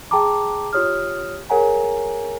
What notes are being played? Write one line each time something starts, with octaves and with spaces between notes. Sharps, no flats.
G#4 G5 A5 A#5 D6
F4 G4 C#5 D#6 F6
G#4 A#4 C#5 F#5 G#5 A#5